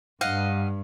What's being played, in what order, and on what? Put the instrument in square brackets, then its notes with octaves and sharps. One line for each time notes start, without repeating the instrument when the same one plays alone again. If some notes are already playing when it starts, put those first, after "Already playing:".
[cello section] G2 [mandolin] D#5 F5 F#5